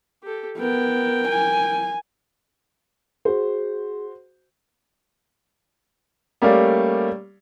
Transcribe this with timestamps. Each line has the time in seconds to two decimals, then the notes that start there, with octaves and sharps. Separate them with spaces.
0.23 G4 A4
0.58 B3 A#4 G5
1.29 G#5
3.25 F#4 G#4 C5
6.42 G3 A3 A#3 C#4 D5 F5